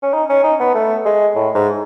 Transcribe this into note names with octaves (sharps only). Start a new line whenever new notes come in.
C#4
D#4
C#4
D#4
B3
A3
G#3
A2
G#2